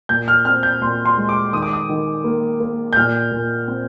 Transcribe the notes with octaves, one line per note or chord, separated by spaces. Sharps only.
A#2 G6
F6
C4 F6
G6
A#2 C6
C6
G#3
D6
D#3 D#6
D6
D#6
D#3
A#3
A#3
G6
A#2 F6
A#2
C4